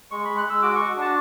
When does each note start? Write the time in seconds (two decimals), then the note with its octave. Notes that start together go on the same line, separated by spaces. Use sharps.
0.11 G#3 C#6
0.25 G#3 B5
0.38 F#6
0.45 G#3 E6
0.62 F#4 D6
0.76 F#4 C#6
0.96 D4 A5